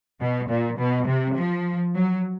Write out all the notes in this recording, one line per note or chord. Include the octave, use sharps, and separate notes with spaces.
B2
A#2
B2
C3
F3
F#3